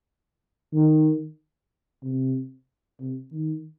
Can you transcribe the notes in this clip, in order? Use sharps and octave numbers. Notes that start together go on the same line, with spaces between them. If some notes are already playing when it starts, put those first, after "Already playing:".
D#3
C3
C3
D#3